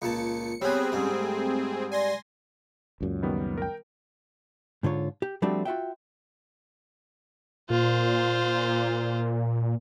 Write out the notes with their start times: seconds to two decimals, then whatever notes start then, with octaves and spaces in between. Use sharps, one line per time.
0.02 C#2 A#2 A5 C#7
0.62 G3 B3 C4 G#4 C#5
0.92 G#2 G3 C#4
1.13 A3
1.92 D5 G#5 C6 A#6
3.01 C#2 F#2 A#2
3.23 D#3 G3 B3
3.57 A#4 G5
4.83 G#2 D3 F4 C#5
5.22 G4
5.42 F3 G3 A3 C4 D4 F#4
5.65 F4 F#4 E5 G5
7.70 A#2 F4 C5